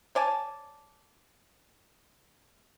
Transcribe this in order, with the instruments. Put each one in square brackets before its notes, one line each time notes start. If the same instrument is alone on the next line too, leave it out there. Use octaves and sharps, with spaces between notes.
[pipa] C#5 D5 G#5 A5